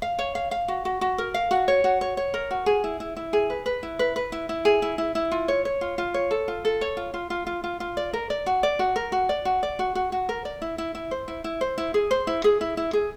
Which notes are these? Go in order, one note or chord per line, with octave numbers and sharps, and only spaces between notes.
F5
C#5
F5
F5
F#4
F#4
F#4
A#4
F5
F#4
C#5
F#4
C#5
C#5
A#4
F#4
G#4
E4
E4
E4
G#4
B4
B4
E4
B4
B4
E4
E4
G#4
E4
E4
E4
F4
C#5
C#5
F4
F4
C#5
A4
F4
A4
C#5
F4
F4
F4
F4
F4
F4
D5
A#4
D5
F#4
D5
F#4
A#4
F#4
D5
F#4
D5
F#4
F#4
F#4
A#4
D5
E4
E4
E4
C5
E4
E4
C5
E4
G#4
C5
E4
G#4
E4
E4
G#4